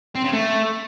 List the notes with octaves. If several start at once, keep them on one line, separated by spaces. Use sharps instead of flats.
C4
C#3
A3